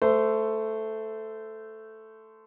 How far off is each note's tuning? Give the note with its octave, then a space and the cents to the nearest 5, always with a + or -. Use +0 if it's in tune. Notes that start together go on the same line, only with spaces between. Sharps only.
A3 +0 C5 -25